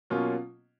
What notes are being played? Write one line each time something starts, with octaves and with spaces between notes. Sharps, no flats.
B2 F#3 A#3 C#4 F4